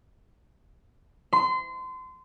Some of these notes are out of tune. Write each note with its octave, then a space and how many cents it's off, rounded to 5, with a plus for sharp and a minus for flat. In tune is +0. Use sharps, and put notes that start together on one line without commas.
C6 -30